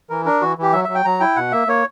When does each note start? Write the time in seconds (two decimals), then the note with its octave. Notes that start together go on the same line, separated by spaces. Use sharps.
0.10 E3 A#4
0.25 D4 A#4
0.42 E3 F#4
0.58 E3 G4
0.73 F#3 E5
0.84 F#3 E5
0.95 G5
1.05 F#3 A#5
1.20 E4 G5
1.36 B2 F#5
1.52 A#3 E5
1.68 A#3 C#5